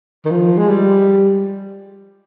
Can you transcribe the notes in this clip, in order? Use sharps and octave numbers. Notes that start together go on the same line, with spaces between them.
D#3
F3
G#3
G3